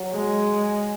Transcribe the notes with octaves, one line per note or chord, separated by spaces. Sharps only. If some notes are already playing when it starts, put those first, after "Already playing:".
Already playing: F#3
G#3